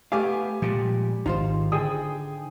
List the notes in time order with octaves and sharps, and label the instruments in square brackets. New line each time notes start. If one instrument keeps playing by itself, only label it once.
[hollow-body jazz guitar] A3 B3 F5 [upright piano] G4 G#5 D6
[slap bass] A#2 [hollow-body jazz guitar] F3 G3 G#3
[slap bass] G#1 [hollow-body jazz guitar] D#4 F4 C5
[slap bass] D3 [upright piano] G#4 G5 D#6